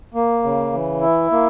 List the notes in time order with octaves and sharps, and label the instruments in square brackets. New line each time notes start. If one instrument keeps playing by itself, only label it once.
[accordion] A#3
C#3
E3
E4
A#3